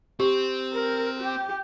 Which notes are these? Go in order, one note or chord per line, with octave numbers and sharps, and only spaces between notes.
C4 G4
A#4
G4